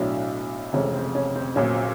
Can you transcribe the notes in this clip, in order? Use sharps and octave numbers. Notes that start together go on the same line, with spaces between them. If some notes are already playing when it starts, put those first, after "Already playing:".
Already playing: B1 A2 F#3 D4
F1 F2 C#3 E3 G#3 C#4
C4
C#4
C4
A#1 A#2 F#3 C#4